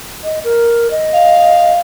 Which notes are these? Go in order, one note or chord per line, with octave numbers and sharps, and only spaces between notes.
D#5
A#4
D#5
F5